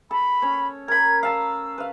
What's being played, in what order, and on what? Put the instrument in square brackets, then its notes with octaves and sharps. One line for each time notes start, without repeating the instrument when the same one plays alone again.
[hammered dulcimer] A4 [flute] B5
[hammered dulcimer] C#4 C#5
[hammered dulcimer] A#4 B5 [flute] G#6
[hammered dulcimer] F5 A5 A#5 [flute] E6
[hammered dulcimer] B4 F5